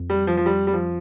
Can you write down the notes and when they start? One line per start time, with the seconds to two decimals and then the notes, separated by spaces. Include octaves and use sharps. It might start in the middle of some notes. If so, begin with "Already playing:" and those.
Already playing: F2
0.10 G3
0.27 F3
0.37 F3
0.46 G3
0.67 G3
0.73 F3